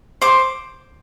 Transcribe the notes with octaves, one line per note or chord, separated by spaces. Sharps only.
C5 D6